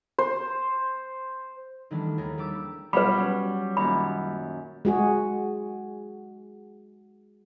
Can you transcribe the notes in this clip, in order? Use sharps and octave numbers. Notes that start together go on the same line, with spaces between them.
C5
D#3 E3 G3 A3 B3 D4
D#2 G#4 A#4 A6
G3 G4 D6 E6 A6
B2 F#3 G3 F4 B4 B5
F#3 C#4
F#2 A#2 D#3 B5
G#3 F#4 G#4